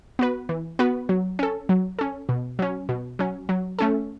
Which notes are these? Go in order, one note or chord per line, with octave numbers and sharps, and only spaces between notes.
B3 F#4 B4
E3
B3 F#4 B4
F#3
C#4 A4
F#3
C#4 A4
B2
F#3 C#4
B2
F#3 C#4
F#3
A3 C#4 A4